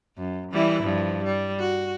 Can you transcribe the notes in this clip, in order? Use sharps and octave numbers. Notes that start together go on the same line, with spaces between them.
F#2
E3 G3 E4
G2 F3
G3
F#4